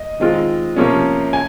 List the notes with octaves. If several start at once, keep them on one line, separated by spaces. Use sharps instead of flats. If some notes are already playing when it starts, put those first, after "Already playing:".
Already playing: D#5
D#3 G#3 C4 F4
C3 F3 A#3 C#4
G#5